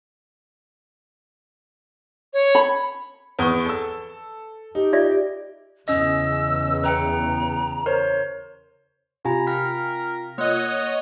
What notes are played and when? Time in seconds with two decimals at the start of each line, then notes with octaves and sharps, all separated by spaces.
2.33 C#5
2.55 B5
3.39 E2 B4 C#6 D#6 G7
3.66 A4 E6
4.75 D#4 G4
4.93 F4 D5 E5
5.88 E2 C#3 C#4 D#5 E6
6.84 B4 G5 A#5 C#7
7.86 A#4 C5 C#5
9.25 C3 F4 G4 G#5 A#5 B5
9.47 A#4 G5 F6 B6
10.38 A#3 C#5 D#5 F#5